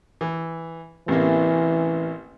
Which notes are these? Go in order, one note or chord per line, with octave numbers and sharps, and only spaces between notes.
E3
A1 C3 E3 A#3